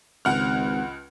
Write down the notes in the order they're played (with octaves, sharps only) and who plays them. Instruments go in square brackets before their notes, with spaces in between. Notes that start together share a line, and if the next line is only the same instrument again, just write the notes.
[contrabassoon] G#1 [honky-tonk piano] C#2 F#5 F6